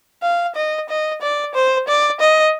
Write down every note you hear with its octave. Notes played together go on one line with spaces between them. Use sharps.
F5
D#5
D#5
D5
C5
D5
D#5